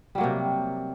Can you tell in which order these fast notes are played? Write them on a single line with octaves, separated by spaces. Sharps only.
G3 F#3 A#3 C3